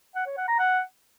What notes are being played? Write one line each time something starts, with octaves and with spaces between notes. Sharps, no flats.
F#5
C#5
F#5
A#5
F#5